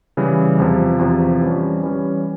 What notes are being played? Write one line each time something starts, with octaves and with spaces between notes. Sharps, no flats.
C#3 E3 G3
E2 C3 F3
E2 C3 F3
E3 G3 C#4
E3 G3 C#4